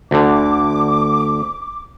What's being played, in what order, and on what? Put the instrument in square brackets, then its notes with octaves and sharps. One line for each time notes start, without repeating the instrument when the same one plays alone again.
[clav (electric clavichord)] D2 D3 [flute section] D6